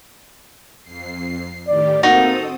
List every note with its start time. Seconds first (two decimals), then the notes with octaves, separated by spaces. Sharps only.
0.83 F2 C7
1.68 A2 D#3 G4 D5
2.03 A#3 C4 D#4 F#4 A4 D#6